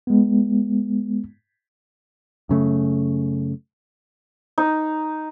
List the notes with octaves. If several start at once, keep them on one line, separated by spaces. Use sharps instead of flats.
G#3 B3
F#2 C#3 A3
D#4